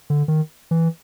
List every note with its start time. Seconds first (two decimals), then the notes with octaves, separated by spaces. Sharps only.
0.10 D3
0.28 D#3
0.71 E3